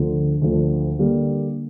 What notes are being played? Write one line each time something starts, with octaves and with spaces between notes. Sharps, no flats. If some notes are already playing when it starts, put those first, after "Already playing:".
Already playing: D2 D3 F3
D2 D3 F3
D3 G3 A#3